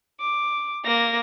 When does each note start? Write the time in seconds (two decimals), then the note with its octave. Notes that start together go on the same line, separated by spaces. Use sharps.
0.20 D6
0.86 A#3 A#6